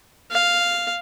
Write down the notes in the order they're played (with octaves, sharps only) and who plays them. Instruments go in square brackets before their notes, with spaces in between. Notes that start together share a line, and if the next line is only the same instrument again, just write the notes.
[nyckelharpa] F5